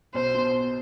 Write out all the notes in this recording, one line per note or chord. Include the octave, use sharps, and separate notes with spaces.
B1 C5
B2